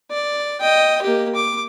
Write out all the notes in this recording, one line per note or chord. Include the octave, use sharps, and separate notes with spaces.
D5
D#5 G5
A#3 G4
D6